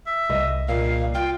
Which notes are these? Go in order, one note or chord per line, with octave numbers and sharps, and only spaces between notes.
E5
C2 D#5
A#2 F5
F4 G5